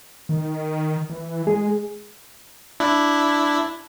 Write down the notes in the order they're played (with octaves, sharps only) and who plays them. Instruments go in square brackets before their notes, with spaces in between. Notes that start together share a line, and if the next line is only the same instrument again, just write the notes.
[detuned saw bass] D#3
E3
[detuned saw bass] G#3 [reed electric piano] G#4
[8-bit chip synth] D4 E4